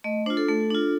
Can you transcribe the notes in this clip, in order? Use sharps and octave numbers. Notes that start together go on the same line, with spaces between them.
A3 D#5
D4 F4 C5
A4
A3 A4
D4 F4